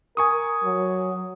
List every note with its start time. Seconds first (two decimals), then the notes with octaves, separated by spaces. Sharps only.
0.17 A#4 G#5 C#6 D#6
0.64 F#3